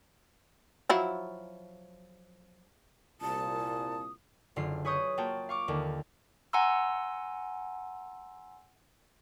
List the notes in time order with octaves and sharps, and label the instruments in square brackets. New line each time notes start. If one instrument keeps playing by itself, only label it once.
[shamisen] F3 F#3 E4
[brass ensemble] C2 A#2 [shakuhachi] A5 [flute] D#6
[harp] F#1 D3 F4 C7
G#4 B4 C#5 C#6 D#6 G6
A#3 F4 F#4 G5 A5
F5 C#6 D6
D#2 D3 A#3
[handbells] F#5 G#5 A#5 C6 E6